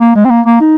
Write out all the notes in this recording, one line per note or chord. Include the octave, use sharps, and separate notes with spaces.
A#3
G#3
C4
A#3
A#3
D#4